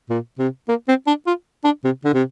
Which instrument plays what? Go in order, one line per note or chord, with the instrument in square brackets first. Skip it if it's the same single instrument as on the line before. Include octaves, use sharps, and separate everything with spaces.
[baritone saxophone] A#2
C3
A#3
C4
D4
F4
D4
C3
D3
C3